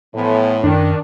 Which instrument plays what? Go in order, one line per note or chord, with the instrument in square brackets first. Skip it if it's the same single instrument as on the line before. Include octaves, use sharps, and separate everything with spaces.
[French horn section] A2 [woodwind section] E3 F3 B3
[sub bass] F#2 [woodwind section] D#3 [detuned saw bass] D4